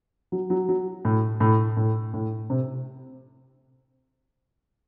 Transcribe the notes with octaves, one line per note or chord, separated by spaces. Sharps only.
F#3
F#3
F#3
A2
A2
A2
A2
C3